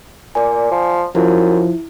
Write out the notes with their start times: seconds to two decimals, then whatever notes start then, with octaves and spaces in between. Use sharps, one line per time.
0.35 A#2 D5 G#5
0.71 F3
1.15 F#2 F3 E4